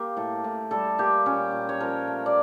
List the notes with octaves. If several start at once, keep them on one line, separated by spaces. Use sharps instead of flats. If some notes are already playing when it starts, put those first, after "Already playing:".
Already playing: A#3 G4
A2 A4
A2
G3 A4
A#3 G4
A#2 C#4
A#2
C#5
F3 A#4
A3
D5